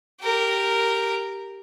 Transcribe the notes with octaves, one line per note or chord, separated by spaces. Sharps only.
G4 A#4